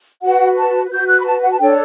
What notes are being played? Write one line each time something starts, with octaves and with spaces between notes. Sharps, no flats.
F#4 B4 F#5
A5
F#4 B4 G6
F#6
B5
A5
F#5
A5
D4 A4 C#5 G5